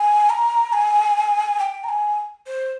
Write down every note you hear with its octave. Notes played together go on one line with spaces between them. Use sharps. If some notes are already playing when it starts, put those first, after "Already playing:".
Already playing: G#5
A#5
G#5
G5
A#5
G#5
C5